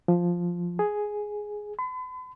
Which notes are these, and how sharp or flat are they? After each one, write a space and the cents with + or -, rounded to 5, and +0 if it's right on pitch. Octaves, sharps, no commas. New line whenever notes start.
F3 +0
G#4 +5
B5 +45